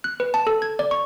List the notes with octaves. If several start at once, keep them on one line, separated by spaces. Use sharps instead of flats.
F#6
B4
A5
A4
G#6
D5
C#6